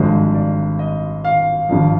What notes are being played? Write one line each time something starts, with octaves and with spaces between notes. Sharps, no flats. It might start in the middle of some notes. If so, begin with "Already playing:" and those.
Already playing: G#1 G2 D3 F3 G#3 C5
D5
D#5
F5
G#1 G2 F3